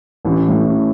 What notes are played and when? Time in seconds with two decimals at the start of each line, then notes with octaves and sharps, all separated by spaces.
0.25 A1
0.45 A2 E3
0.65 A1